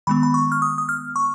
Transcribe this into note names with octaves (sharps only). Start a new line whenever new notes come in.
D#3 G#3 B3 B5
B5
C#6
F6
D#6
D#6
F6
C#6